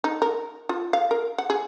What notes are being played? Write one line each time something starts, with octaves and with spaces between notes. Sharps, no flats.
D#4
A#4
F4
F5
A#4
F#5
G#4